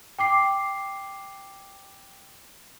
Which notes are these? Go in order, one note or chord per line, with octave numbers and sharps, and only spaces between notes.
G5 D6 C7